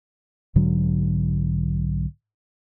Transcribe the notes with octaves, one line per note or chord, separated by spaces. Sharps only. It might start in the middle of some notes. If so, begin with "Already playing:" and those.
B1 G#2 D3 F#3